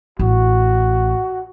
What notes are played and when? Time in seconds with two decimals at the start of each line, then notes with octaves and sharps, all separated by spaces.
0.19 A1 F#4